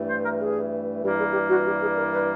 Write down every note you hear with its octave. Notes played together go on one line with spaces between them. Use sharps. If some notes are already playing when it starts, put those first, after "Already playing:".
Already playing: G2 E3 A3
C5
A#4
G#4
G2 E3 G3 A#3 G4
G#4
G4
F#4
G4
G#4
A#4
B4